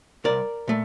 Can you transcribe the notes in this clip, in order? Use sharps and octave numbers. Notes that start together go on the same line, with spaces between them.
C2 A#4 D5
A#2 A3